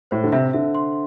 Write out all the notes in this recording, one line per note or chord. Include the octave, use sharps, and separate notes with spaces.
A2 C5
D3
C3 E5
D3 E5
C6